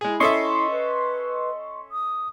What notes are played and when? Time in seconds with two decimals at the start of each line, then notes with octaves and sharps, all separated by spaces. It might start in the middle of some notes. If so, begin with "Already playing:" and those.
0.01 G#3 E4 G#4
0.20 C#4 A4 D#5 E5 C6 C#6
0.70 B4
1.91 D#6